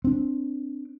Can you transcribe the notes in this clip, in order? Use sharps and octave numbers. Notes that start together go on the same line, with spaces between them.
C4 D4